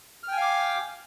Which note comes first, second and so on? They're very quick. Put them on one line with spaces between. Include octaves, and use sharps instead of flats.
F6 G5 G#5 F5 D6